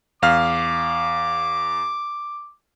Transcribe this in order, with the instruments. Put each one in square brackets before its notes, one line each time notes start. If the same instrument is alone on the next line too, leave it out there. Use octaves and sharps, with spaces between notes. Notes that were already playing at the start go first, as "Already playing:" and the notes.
[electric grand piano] E2 F5 F6 [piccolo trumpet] D6